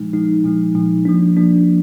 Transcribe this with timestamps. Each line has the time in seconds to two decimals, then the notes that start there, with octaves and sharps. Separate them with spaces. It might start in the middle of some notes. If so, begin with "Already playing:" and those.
Already playing: A#2 F3 G#3 D#4
0.13 A#2 F3 G#3 D#4
0.44 A#2 F3 G#3 D#4
0.75 A#2 F3 G#3 D#4
1.05 F3 A#3 D4
1.37 F3 A#3 D4